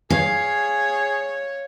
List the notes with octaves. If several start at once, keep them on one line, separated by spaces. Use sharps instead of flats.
G#4 C#5 F5